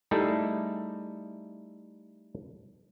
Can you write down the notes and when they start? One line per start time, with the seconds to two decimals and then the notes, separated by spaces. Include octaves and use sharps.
0.11 G3 A3 D#4 E4 G#4 A4